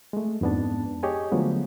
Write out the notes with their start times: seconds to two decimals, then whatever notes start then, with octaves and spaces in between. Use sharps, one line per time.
0.13 G#3 A3
0.41 F2 G#2 B3 D4 A5
1.03 G4 G#4 C#5 D#5 G#5
1.32 D3 F3 F#3 G#3 A3 B3